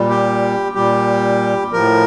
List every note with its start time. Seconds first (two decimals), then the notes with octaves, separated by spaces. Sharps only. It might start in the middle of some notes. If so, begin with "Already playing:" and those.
Already playing: A#2 G3
0.09 G4
0.75 A#2 G3 G4
1.73 A2 F3 A#4